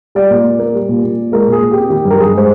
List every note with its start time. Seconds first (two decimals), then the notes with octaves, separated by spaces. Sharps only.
0.15 G3 D5
0.31 A#2
0.44 A#2
0.59 A#3
0.74 G3
0.89 A#2
1.03 A#2
1.18 A#3
1.32 G#3 A#4
1.48 A#2 G#4
1.62 A#2
1.71 G4
1.77 C4
1.90 D#3 G4
2.05 G2
2.10 A#4
2.20 G2 G#4
2.35 G#3 C5